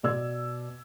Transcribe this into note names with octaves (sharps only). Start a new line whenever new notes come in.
B2 D5 E6 G#6